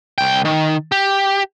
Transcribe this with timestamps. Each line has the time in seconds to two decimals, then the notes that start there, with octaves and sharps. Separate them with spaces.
0.18 C2 G5
0.45 D#3
0.92 G4